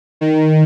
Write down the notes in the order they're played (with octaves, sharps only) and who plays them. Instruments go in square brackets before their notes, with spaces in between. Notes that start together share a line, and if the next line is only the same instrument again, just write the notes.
[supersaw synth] D#3